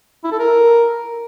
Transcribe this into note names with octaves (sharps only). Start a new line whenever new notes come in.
E4
A4
A#4